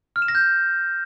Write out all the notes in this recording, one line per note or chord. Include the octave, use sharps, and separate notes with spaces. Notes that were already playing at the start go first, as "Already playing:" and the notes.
F6
E7
A#6
G6